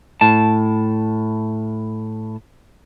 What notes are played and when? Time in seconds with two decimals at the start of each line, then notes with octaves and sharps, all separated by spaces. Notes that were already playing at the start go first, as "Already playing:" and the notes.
0.21 A2 A5